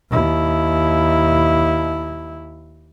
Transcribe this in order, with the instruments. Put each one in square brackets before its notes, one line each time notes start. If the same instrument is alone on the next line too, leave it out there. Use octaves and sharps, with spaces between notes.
[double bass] D#2 E4